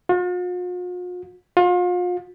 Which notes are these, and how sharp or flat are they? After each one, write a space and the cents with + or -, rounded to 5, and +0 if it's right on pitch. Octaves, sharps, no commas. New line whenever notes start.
F4 +45
F4 +35